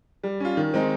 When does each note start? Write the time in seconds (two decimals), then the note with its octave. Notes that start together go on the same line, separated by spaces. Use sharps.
0.23 G3
0.40 C#4 F4
0.57 D#3
0.74 G#3 C4 D#4